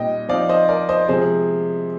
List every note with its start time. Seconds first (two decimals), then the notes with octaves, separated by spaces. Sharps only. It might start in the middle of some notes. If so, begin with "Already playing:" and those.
Already playing: A#2 G3 C4 D#4 D#5 G5
0.29 F3 C4 D#4 D5 F5
0.49 C5 D#5
0.69 A#4 D5
0.89 C5 D#5
1.08 C3 F3 G#3 G#4 C5